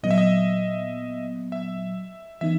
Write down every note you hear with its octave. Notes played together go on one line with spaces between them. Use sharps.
A#2 F#3 B3 D#5
E5
D#5
E5
E3 B3 D#4 E5